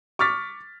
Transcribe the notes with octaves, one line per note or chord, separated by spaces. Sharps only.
C#6 D6 F6 A6 B6